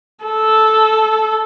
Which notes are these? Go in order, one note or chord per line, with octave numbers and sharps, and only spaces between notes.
A4